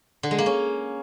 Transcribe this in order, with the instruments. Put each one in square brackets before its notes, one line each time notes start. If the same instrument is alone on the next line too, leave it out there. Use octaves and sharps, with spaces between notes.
[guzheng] D3
G#3
A#3
C#4